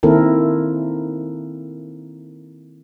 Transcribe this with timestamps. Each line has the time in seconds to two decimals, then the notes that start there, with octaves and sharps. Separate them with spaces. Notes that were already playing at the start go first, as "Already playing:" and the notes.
0.03 D#3 A#3 C4 E4 A4 A#4